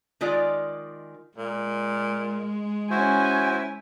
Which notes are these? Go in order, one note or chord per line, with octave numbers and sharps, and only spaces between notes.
D#3 G#3 F4 D5
A#2 G#3
C#4 E4 F#4 C5 G#5